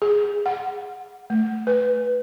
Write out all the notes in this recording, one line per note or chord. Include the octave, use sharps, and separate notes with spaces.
G#4
F#5
A3
B4